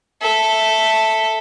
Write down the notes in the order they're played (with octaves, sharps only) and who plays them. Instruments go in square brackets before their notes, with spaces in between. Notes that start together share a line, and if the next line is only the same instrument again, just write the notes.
[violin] A4 E5